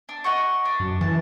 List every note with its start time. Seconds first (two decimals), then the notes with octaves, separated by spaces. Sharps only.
0.09 D4
0.24 D#5 F#5 C#6
0.65 D4
0.80 F#2
1.01 E3 A5